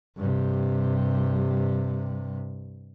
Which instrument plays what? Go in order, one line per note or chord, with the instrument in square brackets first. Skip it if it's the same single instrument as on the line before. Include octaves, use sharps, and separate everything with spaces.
[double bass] G2 C3